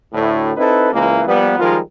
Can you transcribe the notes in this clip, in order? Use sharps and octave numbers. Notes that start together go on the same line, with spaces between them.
D2 A2
C4 D#4 E4 A4 B4
C#2 E3 A#3
F3 G3 A#3 B3
D#3 F3 G3 G#3 F4 A#4